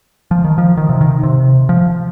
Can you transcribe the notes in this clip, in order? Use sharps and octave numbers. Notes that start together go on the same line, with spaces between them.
F3
D#3
F3
D#3
C3
D#3
C3
F3